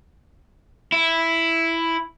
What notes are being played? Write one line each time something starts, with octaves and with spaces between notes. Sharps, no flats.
E4